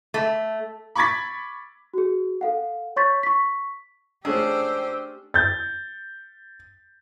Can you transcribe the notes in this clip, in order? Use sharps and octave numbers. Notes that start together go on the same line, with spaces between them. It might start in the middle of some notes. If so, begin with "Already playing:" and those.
A3
B5 C#6 D6 G#6 A6 B6
F#4 G#4
A4 F5 F#5
C#5 C6 C#6 G6 A6 B6
C#6 B6
A3 C#4 D4 G4 G#4 C5 E6
G6 A6